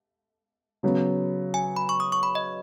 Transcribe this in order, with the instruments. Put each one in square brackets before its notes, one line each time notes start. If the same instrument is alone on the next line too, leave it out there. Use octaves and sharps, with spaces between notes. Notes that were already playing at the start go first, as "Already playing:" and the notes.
[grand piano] C#3 F#3 B3
[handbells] G#5
B5
C#6
D#6
C#6
B5
D#5